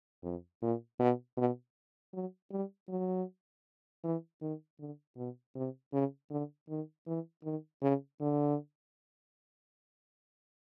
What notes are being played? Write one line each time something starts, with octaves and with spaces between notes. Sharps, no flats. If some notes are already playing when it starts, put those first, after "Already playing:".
F2
A#2
B2
B2
F#3
G3
F#3
E3
D#3
D3
B2
C3
C#3
D3
D#3
E3
D#3
C#3
D3